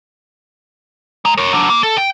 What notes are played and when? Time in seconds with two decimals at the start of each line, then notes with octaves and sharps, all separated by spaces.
1.25 G#3 A#5
1.37 A#4 C#5
1.53 F#3 D4
1.70 A#3
1.83 A4
1.98 G5